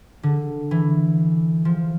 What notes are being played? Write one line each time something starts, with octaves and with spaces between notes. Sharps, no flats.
D3
E3
F3